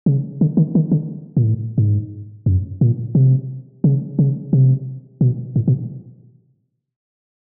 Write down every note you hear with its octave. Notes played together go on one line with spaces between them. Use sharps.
C#3
D3
D#3
D#3
D3
A#2
A2
G#2
F#2
A#2
C3
C#3
C#3
C3
B2
A2
B2